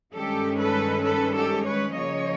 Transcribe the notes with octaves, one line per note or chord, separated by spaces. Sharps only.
G2 D#3 G#3 C#4 G4 A4
A4 B4
A4 B4
G4 A4
B4 C#5
C#3 F3 A#3 C#5 D#5